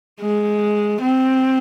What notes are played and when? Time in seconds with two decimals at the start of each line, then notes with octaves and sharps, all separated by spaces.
0.20 G#3
1.01 C4